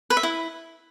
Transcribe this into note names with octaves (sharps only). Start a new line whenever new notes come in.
B4
E5
E4